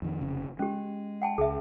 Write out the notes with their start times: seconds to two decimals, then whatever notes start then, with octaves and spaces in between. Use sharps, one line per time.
0.02 F2 D#3
0.21 F1 C#3
0.59 G#3 C#4 G4
1.22 F#5 G5 A5
1.38 C#2 G#4 E5